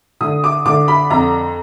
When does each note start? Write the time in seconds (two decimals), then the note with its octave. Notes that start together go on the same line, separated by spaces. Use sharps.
0.21 D3 D#6
0.44 D6
0.65 D3 D6
0.88 B5
1.10 F2 A#5